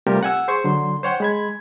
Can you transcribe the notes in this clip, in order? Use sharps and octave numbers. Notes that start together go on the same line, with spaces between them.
C3 G3 A3 F4 G4 A#4
F#5 G#5 E6
G#4 C5 C#6
D3 F#3 C6
C5 C#5 F#5 G5
G#3 B5 G#6